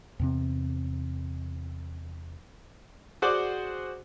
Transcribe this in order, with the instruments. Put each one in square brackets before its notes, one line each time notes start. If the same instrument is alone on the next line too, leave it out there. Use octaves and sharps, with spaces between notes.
[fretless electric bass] E2 C3 C4
[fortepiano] F#4 G#4 C5 D5 F#5 D6